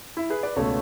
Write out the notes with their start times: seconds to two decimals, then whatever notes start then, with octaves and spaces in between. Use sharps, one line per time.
0.17 E4
0.30 G#4 B4
0.43 B4 D5
0.56 C#2 B2 A3 A4 C#5